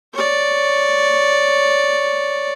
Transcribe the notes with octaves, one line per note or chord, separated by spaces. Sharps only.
C#5 D5